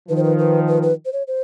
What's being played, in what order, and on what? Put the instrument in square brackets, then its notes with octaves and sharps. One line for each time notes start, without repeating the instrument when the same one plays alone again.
[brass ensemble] D#3 F3 [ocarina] B4
[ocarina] C5
B4
B4
B4
B4
C5
C#5
C5